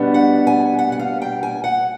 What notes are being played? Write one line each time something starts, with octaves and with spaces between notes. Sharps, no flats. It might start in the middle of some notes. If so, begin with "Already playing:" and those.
Already playing: B2 G3 B3 D4
F#5
G#5
F#5
F#5
F5
G5
G#5
F#5